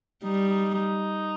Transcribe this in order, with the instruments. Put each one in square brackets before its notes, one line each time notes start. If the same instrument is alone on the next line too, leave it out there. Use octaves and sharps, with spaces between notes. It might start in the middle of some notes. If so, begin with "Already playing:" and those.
[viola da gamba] G3 [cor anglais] D#4
[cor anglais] D#4
D#4